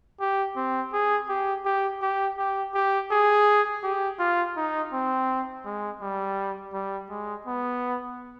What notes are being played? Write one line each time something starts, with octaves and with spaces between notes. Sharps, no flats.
G4
C4
G#4
G4
G4
G4
G4
G4
G#4
G4
F4
D#4
C4
G#3
G3
G3
G#3
B3